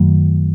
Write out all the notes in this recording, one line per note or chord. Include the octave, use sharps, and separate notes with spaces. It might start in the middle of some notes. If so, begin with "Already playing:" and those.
Already playing: F#2 D#3 F#3 A3